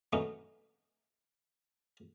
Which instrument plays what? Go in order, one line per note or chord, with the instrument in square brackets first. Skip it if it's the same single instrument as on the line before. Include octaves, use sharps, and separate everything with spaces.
[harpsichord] F#3 A3 B3 C#4 D#4